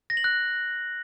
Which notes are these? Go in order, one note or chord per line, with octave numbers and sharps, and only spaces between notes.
A#6
F#7
F#6